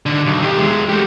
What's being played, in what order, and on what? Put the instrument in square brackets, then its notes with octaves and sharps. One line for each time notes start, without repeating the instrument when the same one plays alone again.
[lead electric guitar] D#2 D3
B1
D#3 G4
E2 G#3
A3 G4